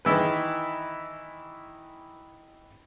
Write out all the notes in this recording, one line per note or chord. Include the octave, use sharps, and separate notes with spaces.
D#3 E3 B4